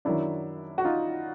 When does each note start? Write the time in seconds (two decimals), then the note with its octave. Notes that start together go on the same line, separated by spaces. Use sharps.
0.05 F#2 D#3 F#3 D4 E4
0.78 F#4
0.85 D#4 F4